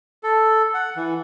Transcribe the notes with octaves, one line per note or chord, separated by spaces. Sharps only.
A4
F#5
E3